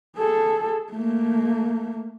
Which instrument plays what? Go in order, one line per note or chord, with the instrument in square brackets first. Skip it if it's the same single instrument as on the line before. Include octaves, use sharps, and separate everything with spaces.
[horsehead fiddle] G#4 A4
A3 A#3